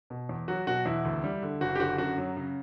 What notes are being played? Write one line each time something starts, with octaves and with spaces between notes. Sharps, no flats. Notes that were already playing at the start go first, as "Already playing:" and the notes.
B2
E2
F#3 F#4
B2 F#4
E2 E4
D2
G3
D3
F#1 F#4
G4
D3 F#4
F#2 F#4
F#3
C#3